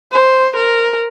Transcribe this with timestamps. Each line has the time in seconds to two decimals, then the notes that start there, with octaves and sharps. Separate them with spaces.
0.12 C5
0.56 A#4